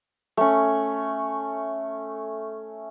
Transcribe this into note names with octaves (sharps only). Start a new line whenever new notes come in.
A3 C#4